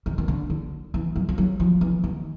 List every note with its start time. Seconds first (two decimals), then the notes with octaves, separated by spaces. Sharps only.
0.06 D#3
0.18 D#3
0.28 D3
0.50 D3
0.94 E3
1.16 F#3
1.29 F3
1.38 F#3
1.60 F3
1.81 E3
2.04 D#3